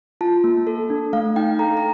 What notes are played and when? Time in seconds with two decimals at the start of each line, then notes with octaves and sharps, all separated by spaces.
0.21 F4 A5
0.44 A#3
0.67 A4
0.90 D4
1.13 A3 F5
1.36 D#4 G5
1.59 A4 A#5
1.77 A#5